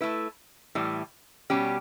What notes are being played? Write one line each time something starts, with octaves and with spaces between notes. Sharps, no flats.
A3 E4 B4
A2 E3 G3
B2 G3 C#4 G4